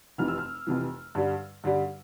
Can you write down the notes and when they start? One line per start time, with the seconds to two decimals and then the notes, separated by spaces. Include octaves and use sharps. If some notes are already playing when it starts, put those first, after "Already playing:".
0.18 F1 F2 C3 E3 F6
0.28 E6
0.38 F6
0.67 F1 F2 C3 E3
1.15 G2 D3 G3
1.64 G2 D3 G3